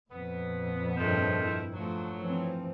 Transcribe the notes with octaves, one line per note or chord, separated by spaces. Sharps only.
F2 A#2 B3
G2 F3 G#3 A3 C#4 A#4
E4
F3 F#3 A3
E3 F3 C4